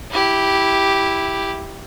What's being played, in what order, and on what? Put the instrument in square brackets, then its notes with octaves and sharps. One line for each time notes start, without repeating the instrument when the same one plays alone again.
[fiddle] E4 G4